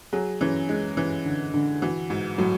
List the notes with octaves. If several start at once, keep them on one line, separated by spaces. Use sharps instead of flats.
F#3 G#4
E3 C#4
G#3 C#4
E3 C#4
D3
D3
E3 F#4
G#2 F#4
A2 F#3